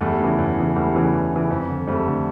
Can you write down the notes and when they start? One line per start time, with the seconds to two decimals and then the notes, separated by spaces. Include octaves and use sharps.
0.01 E2 G3 A3
0.20 C#3 E3
0.38 E2
0.58 C#3 E3
0.76 E2 G3 A3
0.94 C#3 E3
1.14 E2
1.32 C#3 E3
1.50 F2
1.69 D3
1.87 F2 G3 A3
2.07 D3